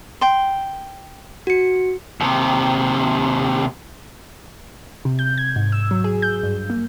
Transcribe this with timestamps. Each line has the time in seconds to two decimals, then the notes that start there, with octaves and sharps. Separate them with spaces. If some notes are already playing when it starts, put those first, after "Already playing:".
0.21 G5 C6
1.47 F#4 C#7
2.20 D#2 C3
5.05 C3
5.19 G6
5.38 G#6
5.56 G#2
5.72 E6
5.91 F#3
6.04 G#4
6.22 G6
6.43 G2
6.70 A#3